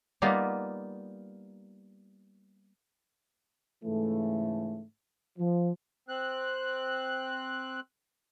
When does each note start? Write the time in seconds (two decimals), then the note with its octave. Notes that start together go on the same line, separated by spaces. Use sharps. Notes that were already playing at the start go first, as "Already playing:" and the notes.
0.22 G3 A#3 B3 D#4 F4
3.85 G#2 C#3 E3 A3
5.39 F3
6.08 C4 F#6